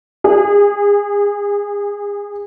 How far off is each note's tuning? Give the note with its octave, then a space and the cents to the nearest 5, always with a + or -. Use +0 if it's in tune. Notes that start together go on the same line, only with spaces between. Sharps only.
G#4 -30